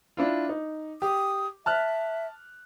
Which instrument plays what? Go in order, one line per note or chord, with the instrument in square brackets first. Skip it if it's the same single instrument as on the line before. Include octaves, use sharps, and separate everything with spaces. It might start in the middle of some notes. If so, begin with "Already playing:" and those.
[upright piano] D4 E4 F4
D#4
[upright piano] G4 [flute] D#6
[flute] E5 [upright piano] A5 F6 F#6